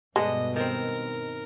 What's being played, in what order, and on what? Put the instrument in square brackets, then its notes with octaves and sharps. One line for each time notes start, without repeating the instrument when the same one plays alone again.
[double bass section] G2 B2 [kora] D3 B3 D4 [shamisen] G#3 [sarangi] D#5
[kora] D#3 C4 [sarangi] A#4